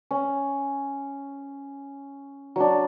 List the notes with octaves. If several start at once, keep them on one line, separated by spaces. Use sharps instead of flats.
C#4
F#3 D4